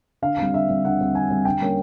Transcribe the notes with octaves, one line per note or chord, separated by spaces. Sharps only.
D3 F5
G3 C4
D3 E5
G3 C4
D3 F#5
G3 C4
D3 G#5
G3 C4
D3 G5
G3 A#3 C#4